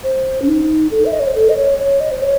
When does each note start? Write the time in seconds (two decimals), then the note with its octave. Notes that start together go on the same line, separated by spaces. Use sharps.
0.04 C5
0.42 C#4
0.48 D#4
0.91 A4
1.05 E5
1.12 D#5
1.20 C#5
1.27 C5
1.35 A4
1.49 D#5
1.57 C#5
1.78 C#5
2.00 D#5
2.11 C5
2.22 C#5